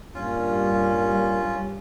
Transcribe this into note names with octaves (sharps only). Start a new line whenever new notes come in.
G2 A#2 C#4 F4